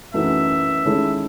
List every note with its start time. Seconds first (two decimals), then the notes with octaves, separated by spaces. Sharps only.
0.14 F#2 E3 A3 D#4 F#4 E5
0.85 D#3 G#3 C#4 E4 A4